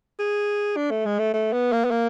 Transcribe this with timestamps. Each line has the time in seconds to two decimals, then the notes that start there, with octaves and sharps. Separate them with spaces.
0.19 G#4
0.77 D4
0.91 A3
1.05 G#3
1.19 A3
1.34 A3
1.53 B3
1.72 A#3
1.85 B3
1.91 A#3